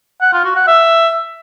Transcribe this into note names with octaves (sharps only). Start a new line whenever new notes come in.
F#5
F4
F#4
F#5
E5